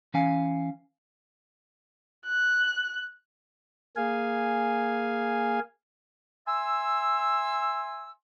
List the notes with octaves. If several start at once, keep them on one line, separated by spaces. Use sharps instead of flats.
E3 C#4 F5 G#5
F#6
A#3 G#4 F5 G#5
E5 G#5 C6 E6